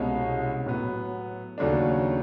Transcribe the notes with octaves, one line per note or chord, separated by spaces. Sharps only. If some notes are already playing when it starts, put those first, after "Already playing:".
Already playing: C2 B2 G#3 C#4
A2 F#3 B3
D#2 C#3 F#3 A3 D4